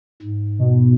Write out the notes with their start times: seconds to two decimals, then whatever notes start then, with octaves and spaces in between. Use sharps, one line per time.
0.22 G#2
0.59 B2